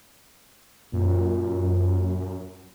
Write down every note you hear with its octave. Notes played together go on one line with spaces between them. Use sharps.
F#2 A#2